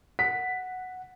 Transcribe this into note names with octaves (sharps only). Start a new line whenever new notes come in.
F#5 B6